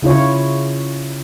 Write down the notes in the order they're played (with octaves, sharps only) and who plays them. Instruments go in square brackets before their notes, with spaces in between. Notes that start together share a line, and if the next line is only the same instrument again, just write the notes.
[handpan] C#3 E4 F4 C#5